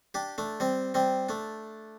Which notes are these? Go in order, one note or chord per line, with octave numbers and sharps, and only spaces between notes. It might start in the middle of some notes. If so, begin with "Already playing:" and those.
D4 G4
A3 D4
G3 C4
G3 C4
A3 D4